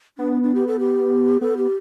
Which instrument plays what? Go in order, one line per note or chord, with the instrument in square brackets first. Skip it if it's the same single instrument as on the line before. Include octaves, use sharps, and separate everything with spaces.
[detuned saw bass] B3 [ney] D4
[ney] D4
G4
A4
G4
[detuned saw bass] B3 [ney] A4
[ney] G4